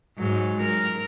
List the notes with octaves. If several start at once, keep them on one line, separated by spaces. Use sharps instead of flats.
G#2 F#3
A#4